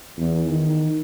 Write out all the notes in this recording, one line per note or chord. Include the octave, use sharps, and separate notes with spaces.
E2
D#3